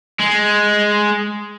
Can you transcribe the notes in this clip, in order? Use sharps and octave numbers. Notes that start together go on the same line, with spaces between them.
G#3